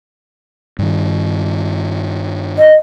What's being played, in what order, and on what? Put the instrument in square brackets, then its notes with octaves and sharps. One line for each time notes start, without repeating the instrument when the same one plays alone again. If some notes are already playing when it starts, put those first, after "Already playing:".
[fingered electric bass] G2 D#3
[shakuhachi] D#5